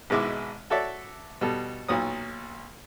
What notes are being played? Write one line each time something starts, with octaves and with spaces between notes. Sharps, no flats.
G#1 B2 G#3 E4 D6
F#4 A4 C#5 D5 E5
B2 G3 A4
B1 A#2 F#3 D#6